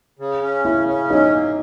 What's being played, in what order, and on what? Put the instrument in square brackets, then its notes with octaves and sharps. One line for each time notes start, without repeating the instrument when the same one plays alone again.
[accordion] C#3
C#4
[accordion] C#3 [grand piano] E4 E5
[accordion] C#4
[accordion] F#3 [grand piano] D#4 D#5
[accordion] A#3